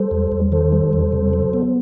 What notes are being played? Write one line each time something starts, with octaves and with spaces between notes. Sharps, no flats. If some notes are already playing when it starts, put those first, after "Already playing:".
Already playing: G3 A4 C5
E2
E2
D#3 A4 C5
G3
E2
C3
F#3
B3